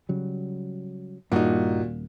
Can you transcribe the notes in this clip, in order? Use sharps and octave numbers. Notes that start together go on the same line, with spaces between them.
C#3 F#3 G3
D#1 G2 A#2 A#3 D#4 F#4